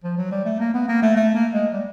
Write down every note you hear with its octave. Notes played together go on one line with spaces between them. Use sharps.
F3
F#3
G3
A3
A#3
B3
A#3
A3
A3
A#3
G#3
G3